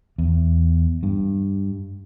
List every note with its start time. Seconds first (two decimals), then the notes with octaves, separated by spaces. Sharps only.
0.18 E2
1.03 G2